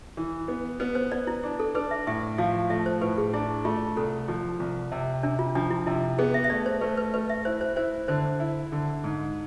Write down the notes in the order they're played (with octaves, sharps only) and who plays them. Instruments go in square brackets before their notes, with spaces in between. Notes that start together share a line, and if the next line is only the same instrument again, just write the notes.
[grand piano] E3
B3
[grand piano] B3 [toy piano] B4
[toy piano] C5
[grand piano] B3 [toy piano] D5
[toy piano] E4
[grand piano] D4
[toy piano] A4
[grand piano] D4 [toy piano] B4
[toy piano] E5
[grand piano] A2 [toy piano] E5
[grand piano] F3 [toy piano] F5
[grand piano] A3 [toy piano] E5
[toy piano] C5
[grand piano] A2 [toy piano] B4
[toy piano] G#4
[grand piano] D4 [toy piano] E4
[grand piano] A3 [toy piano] F4
[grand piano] C2 [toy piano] A4
[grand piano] F3
C2
C3
[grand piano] C3 [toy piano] D4
[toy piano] F4
[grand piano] F3 [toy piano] D4
[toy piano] E4
[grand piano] C3 [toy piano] E4
[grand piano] B3 [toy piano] G#4
[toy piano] E5
E5
[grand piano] A3 [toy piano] D5
[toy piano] C5
[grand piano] A3 [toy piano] B4
[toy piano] B4
[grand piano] A3 [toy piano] B4
[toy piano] E5
[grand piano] E4 [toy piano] C5
[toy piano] C5
[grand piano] E4 [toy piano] C5
[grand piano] D3 [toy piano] C5
[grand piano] E4
D3
G#2